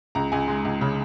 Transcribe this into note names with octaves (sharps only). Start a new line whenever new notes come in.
C#2 A#5
C#2 G#5
G#3
C#2
C#3